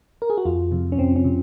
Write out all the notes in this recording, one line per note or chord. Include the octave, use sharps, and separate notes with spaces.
A#4
G#4
F#4
F2 F4
C3 F3
C#4
F2 C4
C#4
C3